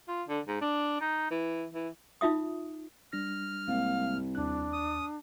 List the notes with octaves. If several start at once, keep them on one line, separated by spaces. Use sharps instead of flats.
F4
D3
G#2
D4
D#4
E3
E3
D#4 F4 E5 D#6
G3 D4 F6 A#6
C2 G#3 A#3 C4 F5
D#2 D4 F#6
D#6